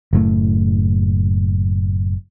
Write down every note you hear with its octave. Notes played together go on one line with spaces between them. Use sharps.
F#1 A2 A3